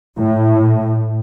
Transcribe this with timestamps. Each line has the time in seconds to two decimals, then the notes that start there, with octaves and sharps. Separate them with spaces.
0.17 A2